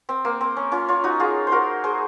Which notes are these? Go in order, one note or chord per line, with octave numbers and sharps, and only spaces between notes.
C4
A#3
C4
C#4
C#4 F4
C#4 F4
D#4 F#4
F4 G#4
C5
F#4 A#4
G#4 C5